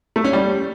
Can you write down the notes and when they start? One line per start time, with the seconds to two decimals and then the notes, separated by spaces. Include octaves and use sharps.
0.16 A3
0.25 C#4
0.33 G3